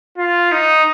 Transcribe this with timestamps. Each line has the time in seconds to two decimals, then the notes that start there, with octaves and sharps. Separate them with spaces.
0.18 F4
0.52 D#4